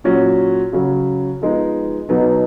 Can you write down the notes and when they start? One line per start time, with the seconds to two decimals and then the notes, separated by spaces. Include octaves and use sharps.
0.04 A#2 F#3 C#4 F#4
0.73 C#3 F#3 C#4 F#4
1.41 F3 G#3 B3 D#4
2.09 B2 F#3 B3 D#4